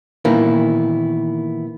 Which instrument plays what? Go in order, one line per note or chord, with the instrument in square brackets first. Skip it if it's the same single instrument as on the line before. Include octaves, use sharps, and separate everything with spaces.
[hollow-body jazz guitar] A#2 D#3 E3 A#3 B3 E4